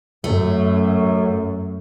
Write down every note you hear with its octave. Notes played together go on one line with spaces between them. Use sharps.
F#2 A3